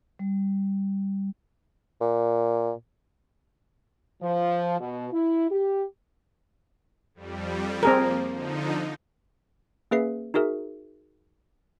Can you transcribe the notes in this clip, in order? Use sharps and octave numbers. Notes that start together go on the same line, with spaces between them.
G3
A#2
F3
B2
E4
G4
F2 G3
F3 A#3 C4 G#4 A#4
D3 F3 D#4
A#3 C#4 G#4 B4 E5 C7
D#4 F#4 G#4 A#4 E5